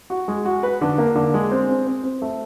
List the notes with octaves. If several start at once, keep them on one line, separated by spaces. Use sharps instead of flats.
F#4
G#3
F#4
B4
D3
A#3
D3
G#3
C4
C4
C4
C4
A3